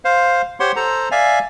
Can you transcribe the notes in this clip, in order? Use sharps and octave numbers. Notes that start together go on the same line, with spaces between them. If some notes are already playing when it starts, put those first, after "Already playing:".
C5 F5
G4 C5 C#5 F#5 C6
A4 C5 A#5
D5 E5 F5 G#5